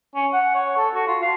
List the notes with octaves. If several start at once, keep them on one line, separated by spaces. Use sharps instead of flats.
C#4
F#5
C#5
A4
F#4
F4
F5